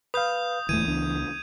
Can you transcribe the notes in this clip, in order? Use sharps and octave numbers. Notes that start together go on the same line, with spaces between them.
B4 F5 D#6 G6
D1 E2 E3 A3 G#6 D#7
C#2 B3 D4